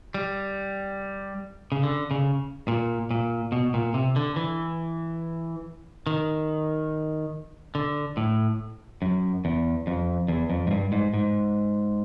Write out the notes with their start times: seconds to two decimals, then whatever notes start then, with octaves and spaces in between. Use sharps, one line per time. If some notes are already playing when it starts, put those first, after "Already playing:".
0.14 G3
1.72 C#3
1.83 D3
2.11 C#3
2.68 A#2
3.11 A#2
3.52 B2
3.74 A#2
3.94 C3
4.16 D3
4.36 E3
6.07 D#3
7.75 D3
8.17 A2
9.02 F#2
9.45 E2
9.87 F2
10.28 E2
10.50 F2
10.67 G#2
10.71 G2
10.92 G#2
11.14 G#2